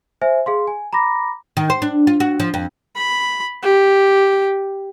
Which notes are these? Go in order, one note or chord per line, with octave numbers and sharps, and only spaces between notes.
C5 E5 G#5
G#4 F5 C6
G#5
A#5 B5 D6 A#6
D#3
C5
D4
F4
F#4
F3
F2
B5
G4